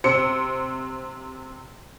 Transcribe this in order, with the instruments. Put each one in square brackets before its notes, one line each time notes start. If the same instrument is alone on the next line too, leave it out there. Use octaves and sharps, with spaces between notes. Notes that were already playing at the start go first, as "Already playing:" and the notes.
[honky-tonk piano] C3 C5 C#7